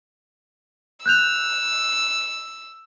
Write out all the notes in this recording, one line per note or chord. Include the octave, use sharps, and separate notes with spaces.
E6 F#6 G6 F7